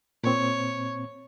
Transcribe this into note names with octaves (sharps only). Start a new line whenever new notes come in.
A#2 C4 C#5